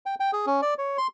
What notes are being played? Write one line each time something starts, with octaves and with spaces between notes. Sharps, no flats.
G5
G5
G#4
C#4
D5
C#5
C6